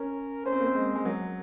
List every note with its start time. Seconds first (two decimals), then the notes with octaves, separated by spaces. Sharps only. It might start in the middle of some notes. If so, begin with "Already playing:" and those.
Already playing: C#4 A#4
0.45 C#4 C5
0.53 C4
0.60 A#3
0.67 C4
0.75 G#3
0.95 G#3
1.05 F#3 A#4